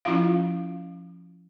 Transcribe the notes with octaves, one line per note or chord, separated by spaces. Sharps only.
F3 C#4 E4 F4 F5